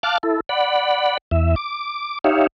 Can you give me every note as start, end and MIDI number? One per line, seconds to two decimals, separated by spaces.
0.03 0.18 77
0.03 0.18 81
0.03 0.18 86
0.03 0.18 89
0.03 0.18 90
0.23 0.40 64
0.23 0.40 69
0.49 1.17 74
0.49 1.17 78
0.49 1.17 83
1.31 1.55 40
1.31 1.55 76
1.56 2.18 86
2.24 2.47 63
2.24 2.47 67
2.24 2.47 73
2.24 2.47 76
2.24 2.47 77